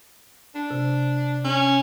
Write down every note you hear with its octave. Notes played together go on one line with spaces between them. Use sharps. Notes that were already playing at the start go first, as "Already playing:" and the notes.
D4
C3
C#4